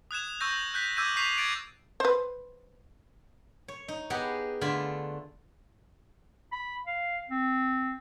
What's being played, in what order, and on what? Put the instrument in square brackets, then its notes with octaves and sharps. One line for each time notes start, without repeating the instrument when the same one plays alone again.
[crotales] D#6 F#6 G#6 E7
C#6 E6 G6 A#6
F#6 G6 B6
D6 E6 G6 G#6 D#7
C#6 E6 G6 B6 C7 F7
G#6 A6 D7
[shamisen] B4 C5
[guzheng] C#5
D#4
B3 G4 G#4 D#5 F#5
D3 A3 F4 D5 G#5 B5
[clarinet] B5
F5
C4